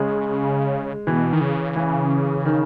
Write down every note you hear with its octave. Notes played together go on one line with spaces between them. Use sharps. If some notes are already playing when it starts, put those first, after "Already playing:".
Already playing: C#3 G#3
B2 E3
D#3
C#3
E3
D#3